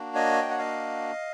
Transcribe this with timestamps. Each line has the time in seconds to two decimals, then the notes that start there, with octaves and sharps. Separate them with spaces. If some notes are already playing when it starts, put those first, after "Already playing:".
Already playing: A#3 D4 F#4
0.15 C#5 D#5
0.42 G5
0.50 F#5
0.59 D#5 F5